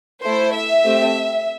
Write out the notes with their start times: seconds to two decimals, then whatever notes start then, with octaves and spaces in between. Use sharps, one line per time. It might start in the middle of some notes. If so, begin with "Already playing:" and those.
0.24 A3 E4 A4 C5
0.53 E5
0.84 A3 C4 G4